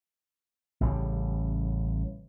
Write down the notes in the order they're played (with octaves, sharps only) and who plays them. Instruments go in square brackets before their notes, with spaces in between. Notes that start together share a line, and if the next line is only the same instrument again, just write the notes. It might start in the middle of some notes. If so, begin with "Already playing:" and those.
[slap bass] A1 C#3 F#3 G3